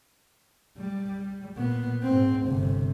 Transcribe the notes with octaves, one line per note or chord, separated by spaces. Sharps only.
G3
A#2 B3
G#2 C4
G1 C3